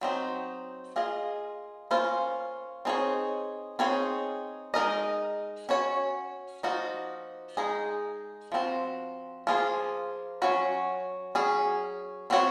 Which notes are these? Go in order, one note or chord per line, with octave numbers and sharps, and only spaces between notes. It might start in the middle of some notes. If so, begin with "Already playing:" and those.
F#3 C4 D#4
A#3 F4 G#4 D#5
A#3 C#4 F4 C5
C4 D#4 G#4 C#5
C4 D#4 G#4 C#5
G#3 D#4 A#4 D#5
C#4 F#4 C#5
F3 A#3 D#4 F#4
G#3 D#4 G#4
F3 C4 F#4
F3 A#3 F4 G#4
F#3 C#4 F#4 C#5
F#3 C#4 G#4
F#3 C4 F#4 C#5